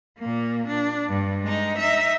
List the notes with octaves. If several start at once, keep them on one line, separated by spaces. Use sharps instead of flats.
A#2 A#3
D4
G2
G#3 D#4
D#4 E5